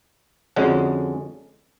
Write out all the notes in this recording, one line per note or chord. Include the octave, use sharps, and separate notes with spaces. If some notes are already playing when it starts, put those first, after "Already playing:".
F2 D3 G#3 C#4 F#4